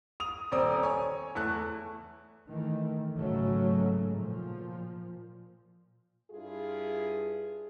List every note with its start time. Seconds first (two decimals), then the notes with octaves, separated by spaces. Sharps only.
0.20 D#6 F7
0.52 D#1 C4 D5 D#6
0.83 C#5 G#5
1.35 E2 A3 F#6
2.50 D#3 E3 A3
3.16 G#1 G#2 C#3 F#3 A3 C#4
4.14 A#2 F3
6.30 G2 E4 F4 G#4